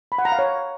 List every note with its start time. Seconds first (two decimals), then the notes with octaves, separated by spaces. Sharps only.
0.12 B5
0.18 F#5
0.25 A#5
0.32 F5
0.39 C#5